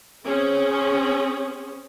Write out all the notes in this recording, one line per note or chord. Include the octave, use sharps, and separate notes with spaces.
C4 C#4 G#4